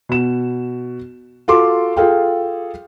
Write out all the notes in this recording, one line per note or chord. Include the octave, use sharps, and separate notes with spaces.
B2 E7
F4 F#4 A4 C6 D6
F4 G#4 A4 F5 G5